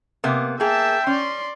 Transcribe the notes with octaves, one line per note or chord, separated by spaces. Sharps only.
C3 A#3 B3
A#3 G#4 E5 G5 A5
C#4 D5 C6